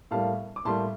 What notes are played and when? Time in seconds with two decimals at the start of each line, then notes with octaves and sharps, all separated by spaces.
0.11 A2 G3 A#3 F5 A5
0.56 D6
0.65 A2 G3 A#3 A5 C6